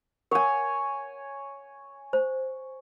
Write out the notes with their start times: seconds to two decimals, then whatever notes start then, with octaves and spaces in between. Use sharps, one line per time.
0.31 A#4 C#5 F#5 G#5
2.13 C5